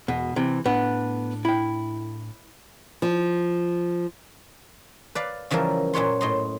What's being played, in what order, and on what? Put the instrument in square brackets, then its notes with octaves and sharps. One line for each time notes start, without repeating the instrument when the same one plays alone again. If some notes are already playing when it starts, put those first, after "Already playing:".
[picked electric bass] E1 [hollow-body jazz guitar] B2
[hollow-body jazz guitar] C3 [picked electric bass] E3
[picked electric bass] A2 D4 [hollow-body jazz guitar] B3
[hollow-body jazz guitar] E4 G5
[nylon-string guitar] F3
[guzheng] B4 D5 F5
C#3 E3 F3 G3 A#4
F#2 A#2 B4 C#5 C6
A2 D#5 C6